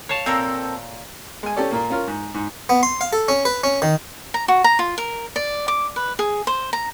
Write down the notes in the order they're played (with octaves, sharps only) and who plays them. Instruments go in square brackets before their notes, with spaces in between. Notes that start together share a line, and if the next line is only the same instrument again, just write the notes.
[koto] C#5 F5 A5
[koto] A#2 [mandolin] C4 A4 A#4
[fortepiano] G#3 G#5
C#4 G4 A4 D5
A#2 A#3
C#4 F4 A#4
G#2
G#2
[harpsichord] B3
C6
F5
A4
C#4
B4
C#4
D#3
[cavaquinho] A#5
F#4
A#5
F4
A#4
D5
D6
B4
G#4
C5
A#5